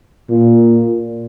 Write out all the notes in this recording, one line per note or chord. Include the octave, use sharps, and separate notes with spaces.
A#2